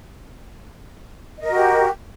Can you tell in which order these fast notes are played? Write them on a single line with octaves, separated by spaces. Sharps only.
D#5 A#4 F#4 G4